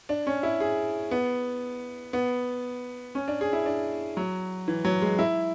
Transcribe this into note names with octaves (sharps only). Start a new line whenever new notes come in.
D4
C#4
E4
G#4
B3
B3
C#4
D4
G#4
E4
D4
F#3
E3
F#3
G#3
E4